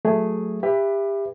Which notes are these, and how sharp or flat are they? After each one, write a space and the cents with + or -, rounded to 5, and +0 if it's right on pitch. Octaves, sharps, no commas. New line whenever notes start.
F#3 -15 A3 +0 G#4 +0
G4 +25 B4 +0 E5 +15